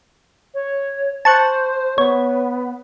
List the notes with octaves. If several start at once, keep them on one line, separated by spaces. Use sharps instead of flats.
C#5
C5 A5 C#6 F#6
B3 C#5